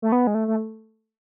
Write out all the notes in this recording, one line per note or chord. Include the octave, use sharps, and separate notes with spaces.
A3
B3
G#3
A3
A3